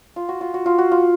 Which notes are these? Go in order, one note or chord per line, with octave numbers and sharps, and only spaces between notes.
F4
F#4
F4
F#4
F4
F#4
F4